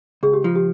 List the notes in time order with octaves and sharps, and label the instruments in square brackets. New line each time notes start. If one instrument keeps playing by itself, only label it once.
[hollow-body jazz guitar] C#2 [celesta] G#4
[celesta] G4
[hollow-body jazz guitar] F3 [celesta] F4
[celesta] G4